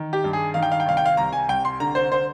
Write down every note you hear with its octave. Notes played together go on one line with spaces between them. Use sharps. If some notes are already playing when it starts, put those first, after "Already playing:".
Already playing: D#3
G4
G2
G#4
D#3 F5
G5
F5
G5
C2 F5
G5
F5
C2 A#5
G#5
C2 G5
C6
D3 A#5
C5
C5